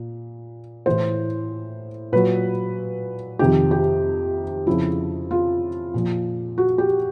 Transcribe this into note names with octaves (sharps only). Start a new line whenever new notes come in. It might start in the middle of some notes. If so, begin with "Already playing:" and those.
Already playing: A#2
A2 E3 C5
A#2 F#3 B4
F2 C3 D#3 G4
G4
F2 C#3 F3 E4
F4
A#2 F3
F#4
G4